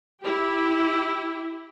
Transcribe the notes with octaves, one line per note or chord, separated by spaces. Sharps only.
E4 G4